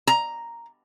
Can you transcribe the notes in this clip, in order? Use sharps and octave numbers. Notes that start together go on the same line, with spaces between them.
A#5